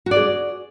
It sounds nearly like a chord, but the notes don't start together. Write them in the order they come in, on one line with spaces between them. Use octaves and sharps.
F#4 D5 G#4